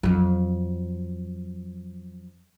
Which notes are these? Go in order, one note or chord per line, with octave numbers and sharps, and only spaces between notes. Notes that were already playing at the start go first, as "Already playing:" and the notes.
F2 F#3